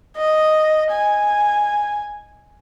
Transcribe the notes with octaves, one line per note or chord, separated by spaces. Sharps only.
D#5
G#5